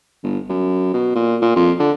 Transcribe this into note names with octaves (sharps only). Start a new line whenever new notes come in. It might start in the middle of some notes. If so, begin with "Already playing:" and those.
G1
F#2
B2
A#2
A#2
F2
D3